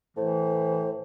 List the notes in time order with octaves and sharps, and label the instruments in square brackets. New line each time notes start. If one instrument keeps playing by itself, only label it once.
[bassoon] A2 [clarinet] E3 [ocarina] C5